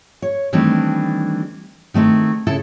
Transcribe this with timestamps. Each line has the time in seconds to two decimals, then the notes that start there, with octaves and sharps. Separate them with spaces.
0.22 C#5
0.53 D#3 E3 G3 A3 C4 D4
1.94 D#3 A3 C4 E4 A#4
2.47 C#3 E4 A4